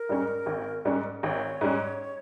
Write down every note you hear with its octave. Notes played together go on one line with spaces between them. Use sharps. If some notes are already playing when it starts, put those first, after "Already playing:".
Already playing: A#4
G#2 G3 C#4
G#1
G#2 G3 C#4
G#1 C#5
G#2 G3 C#4